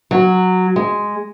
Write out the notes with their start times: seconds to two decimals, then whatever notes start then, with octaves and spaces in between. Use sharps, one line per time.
0.11 F#3
0.76 G#3